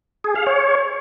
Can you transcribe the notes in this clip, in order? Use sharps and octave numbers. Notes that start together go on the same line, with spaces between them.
G#4
F5
C#5